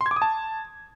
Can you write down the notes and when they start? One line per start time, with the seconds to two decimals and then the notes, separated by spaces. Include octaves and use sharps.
0.01 C6
0.06 G#6
0.11 D6
0.16 D#6
0.22 A5